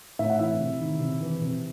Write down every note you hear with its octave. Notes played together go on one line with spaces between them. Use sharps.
A2 E5
F#5
E3 E4 E5
C3
D#3
C3
E3
C3